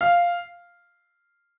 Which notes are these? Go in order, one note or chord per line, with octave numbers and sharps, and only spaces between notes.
F5